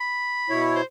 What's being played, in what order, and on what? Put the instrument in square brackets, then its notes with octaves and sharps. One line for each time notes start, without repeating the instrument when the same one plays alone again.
[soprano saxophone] B5
[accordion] B2 E4 C#5
[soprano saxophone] C5